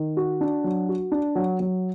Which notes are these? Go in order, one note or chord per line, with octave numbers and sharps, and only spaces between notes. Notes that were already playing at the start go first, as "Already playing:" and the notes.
Already playing: D#3
F#4
D4
F#3
F#4
D4
F#3
F#3